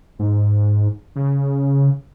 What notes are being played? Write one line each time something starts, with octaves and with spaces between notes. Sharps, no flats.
G#2
C#3